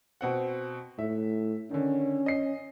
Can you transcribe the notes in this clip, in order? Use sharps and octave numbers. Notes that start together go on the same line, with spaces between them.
B2 C4 F#5
A2 E5
D3 D#3 C#4
D#5 C7